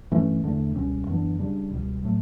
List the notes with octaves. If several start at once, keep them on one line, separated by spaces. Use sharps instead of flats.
G2 E3 A3 C#4
E2 D3 A3 D4
C#2 B2 G3 C#4
F#2 E3 B3 D4
C#3 G3 D4
C#2 B2 G3
A2 F#3 A3